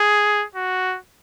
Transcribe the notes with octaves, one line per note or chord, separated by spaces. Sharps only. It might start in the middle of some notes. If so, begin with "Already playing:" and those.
Already playing: G#4
F#4